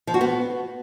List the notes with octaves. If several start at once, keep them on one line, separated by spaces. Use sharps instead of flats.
F3
F#4
B3